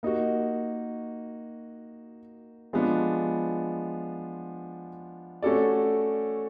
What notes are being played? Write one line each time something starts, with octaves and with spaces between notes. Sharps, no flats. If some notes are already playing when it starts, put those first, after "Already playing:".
A#3 D#4 F#4
F3 G#3 B3 D4 F4
A3 C#4 F#4 A4 D5